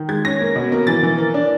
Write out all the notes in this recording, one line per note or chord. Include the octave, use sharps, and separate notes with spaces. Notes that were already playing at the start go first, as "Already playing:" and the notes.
Already playing: D#3
G#3 G#6
C#4 A#6
A#3
B2
A#3
E3 A6
E3
A#3
D4